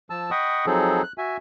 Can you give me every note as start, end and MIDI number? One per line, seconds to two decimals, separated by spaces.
0.10 0.31 53
0.10 0.31 81
0.10 0.31 88
0.31 0.65 75
0.31 0.65 78
0.31 0.65 79
0.31 0.65 83
0.31 0.65 85
0.31 0.65 87
0.66 1.02 53
0.66 1.02 54
0.66 1.02 60
0.66 1.02 63
0.66 1.02 68
0.66 1.02 69
1.03 1.13 90
1.18 1.37 66
1.18 1.37 76
1.18 1.37 80